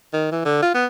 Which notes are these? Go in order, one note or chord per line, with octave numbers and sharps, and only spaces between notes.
D#3
E3
D3
F4
B3